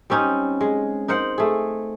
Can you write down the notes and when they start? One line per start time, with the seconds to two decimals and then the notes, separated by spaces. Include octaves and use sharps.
0.10 G3 C4 C#4 D#4
0.61 G#3
1.08 D#4 A#4 C5 F#5
1.38 A3 G#4